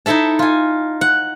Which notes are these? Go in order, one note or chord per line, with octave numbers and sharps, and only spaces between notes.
D#4 E4 A4 E5 A5
F4 G#5
F#5